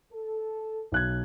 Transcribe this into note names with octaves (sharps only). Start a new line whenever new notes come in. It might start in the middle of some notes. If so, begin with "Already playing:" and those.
A4
B1 F#6 G#6